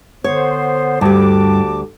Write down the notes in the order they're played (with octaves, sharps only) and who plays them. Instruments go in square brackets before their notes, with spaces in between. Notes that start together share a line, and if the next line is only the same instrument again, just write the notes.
[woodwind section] D3 B3 C5 [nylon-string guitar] C#5
[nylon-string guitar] D2 G3 [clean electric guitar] G2 [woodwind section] F#4 A5 D6